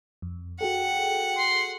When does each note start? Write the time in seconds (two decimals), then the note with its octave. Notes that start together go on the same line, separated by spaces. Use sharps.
0.22 F2
0.61 F#4 G#4 A4 F#5 G5
1.38 C6